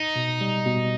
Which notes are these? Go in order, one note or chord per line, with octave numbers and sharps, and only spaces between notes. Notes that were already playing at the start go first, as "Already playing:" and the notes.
Already playing: D#4
B2
G3
B2